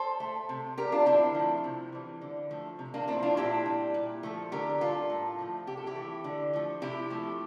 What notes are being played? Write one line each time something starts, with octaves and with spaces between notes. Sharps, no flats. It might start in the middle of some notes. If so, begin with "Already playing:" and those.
Already playing: A4 C5
A3
C3
G3 G4 A#4
D4 F4
D3 C4 E4
F3 A3
C3
E3 G3
D3
F3 A3
C3
A#3 D4
F3 A3 C4 E4
D4 F4
A#2 E4 G4
G3
A#2
F3 A3
D3 G4 A#4
G3 F4 A4
A2
F3 A3
C3 G4
A4
E4 G4
E3 A3
D3
F3 A3
C3 E4 G4
F3 A3